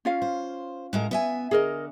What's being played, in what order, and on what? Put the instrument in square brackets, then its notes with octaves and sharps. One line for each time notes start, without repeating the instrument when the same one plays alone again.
[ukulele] C#4 F4 F5
[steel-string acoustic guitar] C5
A2 G#3 A#4
B3 E5 G#5
[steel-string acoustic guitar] D3 [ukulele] G#4 A#4 D#5